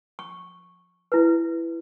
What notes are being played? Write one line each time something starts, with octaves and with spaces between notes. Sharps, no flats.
C#6
E4 B4